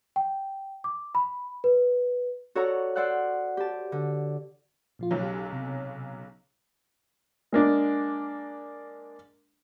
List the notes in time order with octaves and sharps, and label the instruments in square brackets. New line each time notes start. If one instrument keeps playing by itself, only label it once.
[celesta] G5
D6
B5
B4
[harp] F#4 A4 C#5 D5 F#5 A#5
C5 D5 F#5 E6 F#6
G4 A5
D3
[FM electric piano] A#2 F3 F4
[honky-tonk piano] B1 C#3 F#3
[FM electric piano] G4
C3
[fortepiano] G#3 A#3 D4